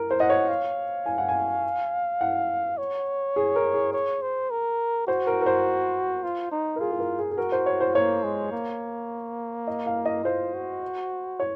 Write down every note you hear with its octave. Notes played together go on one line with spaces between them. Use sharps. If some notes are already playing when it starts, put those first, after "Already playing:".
Already playing: A#4
C5
D#5 F#5
C#5
F5
G#5
F#5
G#5
F#5
C#5
G#4
A#4
G#4
C#5
C5
A#4
F#4 C5
A#4
A#4
C5
F4
D#4
A#4
F4 G#4
G#4
A#4
G#4
G#4
F#4 A#4
C5
C#5
C5
A#3 C#5
G#3
A#3
D#5
F5
D#5
F4 C5
F#4
C#5